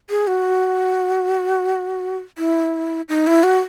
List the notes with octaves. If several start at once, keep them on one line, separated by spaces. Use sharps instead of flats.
G#4
F#4
E4
D#4
E4
F#4